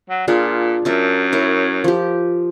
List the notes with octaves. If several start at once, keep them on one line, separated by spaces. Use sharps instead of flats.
F#3
A#2 D4 F4 G#4
F#2 A#4 E5 A5
E4 A#4 C#5
F3 G4